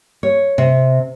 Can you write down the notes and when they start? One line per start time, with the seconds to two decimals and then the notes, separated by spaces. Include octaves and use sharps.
0.23 C#5
0.58 C3